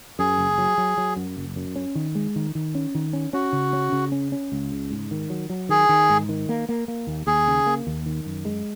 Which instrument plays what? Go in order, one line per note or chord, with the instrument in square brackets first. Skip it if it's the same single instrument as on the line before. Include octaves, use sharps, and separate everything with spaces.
[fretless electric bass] F#2 [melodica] G#4
[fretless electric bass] F#1
F#3
F#3
F#3
F#2
F#1
F#2
C#4
D#3
G#3
D#3
D#3
C#4
D#3
C#4
[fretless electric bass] C#4 [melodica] F#4
[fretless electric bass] C#3
C#4
C#3
C#4
C#4
C#2
C#3
G#2
D#3
F#3
F#3
[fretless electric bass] D#3 [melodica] G#4
[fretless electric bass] D#3
G#2
D#3
A#3
A#3
A#3
D#2
[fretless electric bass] D#2 [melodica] G#4
[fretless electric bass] C#3
A#3
D#2
D#3
F#2
G#3